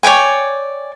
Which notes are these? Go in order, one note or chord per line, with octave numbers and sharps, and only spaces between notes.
C#5 D5 G5 G#5